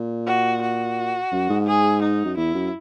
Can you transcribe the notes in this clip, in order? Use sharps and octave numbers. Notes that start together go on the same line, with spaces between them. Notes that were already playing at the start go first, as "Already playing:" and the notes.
Already playing: A#2
F#4
F#4
F#2
G#2
G#4
D#4
F#2
E2 E4
F#2